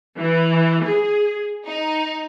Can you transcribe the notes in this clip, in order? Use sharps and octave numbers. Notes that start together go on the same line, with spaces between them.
E3
G#4
D#4